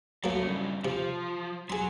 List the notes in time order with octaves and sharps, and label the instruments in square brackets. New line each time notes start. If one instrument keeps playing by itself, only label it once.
[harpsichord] F#3 A#3 [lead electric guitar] A4 C#5
[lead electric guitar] G2 C#3
[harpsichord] C3 [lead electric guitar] F3
[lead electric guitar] F#3 [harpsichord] G#4 C6